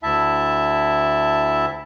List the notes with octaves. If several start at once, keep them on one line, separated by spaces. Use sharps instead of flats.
D2 E4 E5 A5